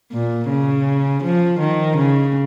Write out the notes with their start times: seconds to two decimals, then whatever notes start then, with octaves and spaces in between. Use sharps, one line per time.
0.12 A#2
0.49 C#3
1.23 F3
1.60 D#3
1.97 C#3